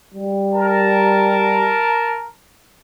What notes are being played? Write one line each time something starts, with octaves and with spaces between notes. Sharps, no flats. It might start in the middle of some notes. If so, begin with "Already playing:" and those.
G3
A#4 A5